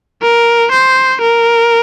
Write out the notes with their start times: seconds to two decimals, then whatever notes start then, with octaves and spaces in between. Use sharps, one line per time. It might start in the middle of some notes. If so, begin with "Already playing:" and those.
0.22 A#4
0.71 C5
1.22 A#4